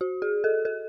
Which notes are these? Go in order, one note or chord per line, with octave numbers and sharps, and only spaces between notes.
F#4
G#4
A4
A4